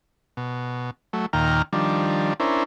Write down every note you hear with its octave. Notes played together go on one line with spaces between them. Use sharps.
B2
F#3 A3
D#2 A#2 D#3 G5 A#5 F6
D#3 F3 G3 D4
C#4 D4 E4 A#4 C5